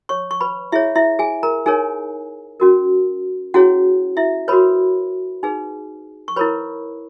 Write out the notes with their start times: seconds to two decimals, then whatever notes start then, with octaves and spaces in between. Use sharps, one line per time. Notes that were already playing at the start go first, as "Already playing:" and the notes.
0.09 C#5 C#6
0.31 C#6
0.41 B4 B5
0.72 E4 G#4 C#5 E5
0.96 E4 E5
1.19 G#4 G#5
1.43 A#4 A#5
1.66 D#4 G#4 A#4 C#5 G#5
2.60 C#4 F#4 A#4
3.54 C#4 E4 F#4 G#4 C#5 F#5
4.17 E4 E5
4.48 F#4 A#4 B4 C#5 B5
5.43 D#4 G#4 B4
6.28 C#6
6.36 E4 A#4 B4 C#5 B5